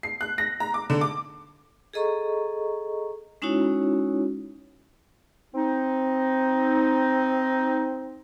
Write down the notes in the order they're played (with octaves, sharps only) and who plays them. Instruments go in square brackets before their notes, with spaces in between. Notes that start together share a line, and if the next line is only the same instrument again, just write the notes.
[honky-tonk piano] C7
F#6
A#6
A#5
D6
D3
D6
[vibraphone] G#4 A4 D#5 A#5 C#6
G#3 C#4 D#4 E4 F#4 C#5
[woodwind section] C4 D#4